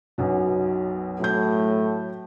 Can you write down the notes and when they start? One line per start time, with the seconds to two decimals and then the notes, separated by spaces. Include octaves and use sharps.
0.18 B1 F#2 B2
1.20 A2 F#3 G6